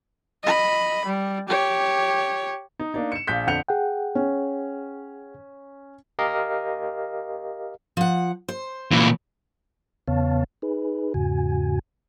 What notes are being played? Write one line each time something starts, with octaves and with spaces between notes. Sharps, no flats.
D#5 B5
G3
G4 C#5
D#4
A#3 D4 D#4
C#7 E7
A#1 F5 G6 B6
F2 D3 F#5 G6 C#7 F7
G#4 F#5 G5
C#4
G4 A#4 D#5 F5
F3 F#5
C5
A#2 E3
E2 C#3 B3 C#5 F5 A5
D#4 G#4 B4
E2 G#2 C#3 F#4 G#5